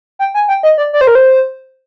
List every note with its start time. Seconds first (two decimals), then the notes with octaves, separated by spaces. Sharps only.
0.19 G5
0.34 G#5
0.48 G5
0.63 D#5
0.78 D5
0.93 D5
1.01 C5
1.07 A#4
1.15 C5